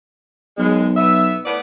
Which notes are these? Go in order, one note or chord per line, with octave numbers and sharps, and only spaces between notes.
B1 F#2 G#3
B3 E5
A2 B3 D5